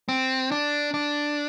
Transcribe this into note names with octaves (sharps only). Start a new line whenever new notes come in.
C4
D4
D4